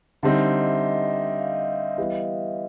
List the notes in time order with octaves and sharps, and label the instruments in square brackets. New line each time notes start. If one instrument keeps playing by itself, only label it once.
[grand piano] D3 G3 C4 D#4 [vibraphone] E5
[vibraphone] D#5
E5
E5
F5
E5
D#5
[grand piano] E3 G3 B3